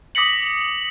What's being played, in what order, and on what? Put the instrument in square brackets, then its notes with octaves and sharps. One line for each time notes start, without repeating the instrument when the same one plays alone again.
[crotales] D6 D#6 A#6 B6 C#7 F#7